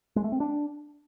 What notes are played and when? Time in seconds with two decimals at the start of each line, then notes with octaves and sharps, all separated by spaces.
0.16 G#3
0.24 A3
0.32 C4
0.40 D4